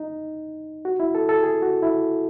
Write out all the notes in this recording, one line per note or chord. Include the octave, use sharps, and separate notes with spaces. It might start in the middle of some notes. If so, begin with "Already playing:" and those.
Already playing: D#4
F#4
E4
A4
A4
G#4
F#4
E4